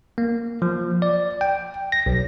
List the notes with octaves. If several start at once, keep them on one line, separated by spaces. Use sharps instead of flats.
A#3
F3
D5
G5
A#6
B1